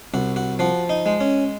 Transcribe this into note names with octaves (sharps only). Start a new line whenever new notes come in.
C2 F#4
F#4
F3 F#4
D#4
G#3
C#4